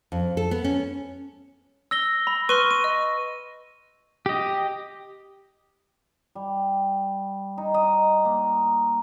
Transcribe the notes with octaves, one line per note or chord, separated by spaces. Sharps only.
F2
A4
B3
C#4
E6 A#6 G7
B5
B4 C6 C#6 F6 D#7
D#7
D#5
G4 D#5
G3
D#4
D#5
A#3